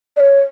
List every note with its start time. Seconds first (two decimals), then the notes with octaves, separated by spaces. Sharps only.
0.17 D5
0.20 C#5